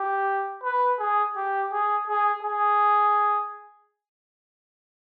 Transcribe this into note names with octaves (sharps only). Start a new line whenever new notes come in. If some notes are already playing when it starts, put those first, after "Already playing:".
Already playing: G4
B4
G#4
G4
G#4
G#4
G#4